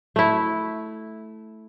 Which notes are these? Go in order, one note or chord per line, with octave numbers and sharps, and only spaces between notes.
A3 E4